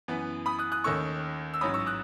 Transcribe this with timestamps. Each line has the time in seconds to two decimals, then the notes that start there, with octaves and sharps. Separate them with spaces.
0.08 F#2 E3 B3
0.46 B5 D#6
0.59 D#6 F#6
0.72 D#6 F#6
0.84 D#2 D#3 A3 C#4 C#6 E6
1.54 E6
1.61 A1 G#2 F#3 C#4 B5 D#6
1.74 C#6 E6
1.86 D#6 F#6